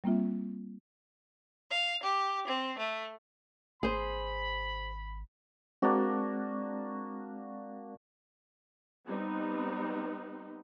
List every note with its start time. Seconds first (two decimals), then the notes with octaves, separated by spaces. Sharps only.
0.04 G3 A#3 C4 F4 E5
1.70 F5
2.04 G4
2.47 C4
2.78 A3
3.83 G#1 G#4 C5 B5
5.82 G#3 A#3 C4 D4 F#4
9.07 G3 B3 C4 D#4